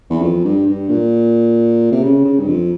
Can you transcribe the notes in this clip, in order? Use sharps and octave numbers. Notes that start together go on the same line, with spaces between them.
E2
F2
G2
G2
A#2
C3
C#3
C#3
G2
F2